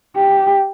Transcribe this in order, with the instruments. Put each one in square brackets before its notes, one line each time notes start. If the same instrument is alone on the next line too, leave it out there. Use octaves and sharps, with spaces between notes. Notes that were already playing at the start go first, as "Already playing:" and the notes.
[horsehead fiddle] G4